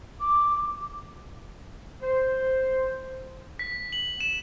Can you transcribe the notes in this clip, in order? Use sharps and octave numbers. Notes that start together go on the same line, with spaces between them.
D6
C5
B6
F#7
E7